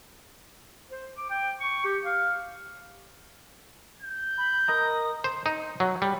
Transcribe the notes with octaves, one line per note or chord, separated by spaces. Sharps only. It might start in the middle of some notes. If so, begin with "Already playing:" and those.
C5
D6
G5
C#6
G4
F5
G6
B5
A#4 D#5 A#5 D#6
C5
D#4
F#3
G3